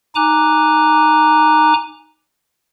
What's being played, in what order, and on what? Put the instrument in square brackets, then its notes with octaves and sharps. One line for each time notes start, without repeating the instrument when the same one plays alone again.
[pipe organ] D#4 G#5 A#5 D6 F#6